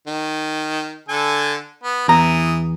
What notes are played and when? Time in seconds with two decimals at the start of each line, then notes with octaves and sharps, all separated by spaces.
0.07 D#3
1.09 D3 A4 G#5
1.83 B3
2.08 E2 E3 A#5 D#6